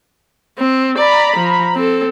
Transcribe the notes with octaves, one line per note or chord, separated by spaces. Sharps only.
C4
D5 A#5 B5
F3
C4 A4